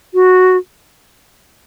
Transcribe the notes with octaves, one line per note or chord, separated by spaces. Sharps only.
F#4